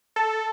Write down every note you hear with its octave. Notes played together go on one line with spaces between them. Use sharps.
A4